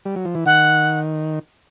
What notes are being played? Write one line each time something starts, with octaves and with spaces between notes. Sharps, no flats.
G3
F#3
F3
E3
D#3 F#5